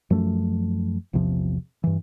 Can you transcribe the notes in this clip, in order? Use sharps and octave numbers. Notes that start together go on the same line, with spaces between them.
F#2 F3 A3
A#1 E2 C3 F3
G2 E3